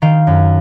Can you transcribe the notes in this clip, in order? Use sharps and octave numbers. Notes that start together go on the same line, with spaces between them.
D#3 F5 G5
F#2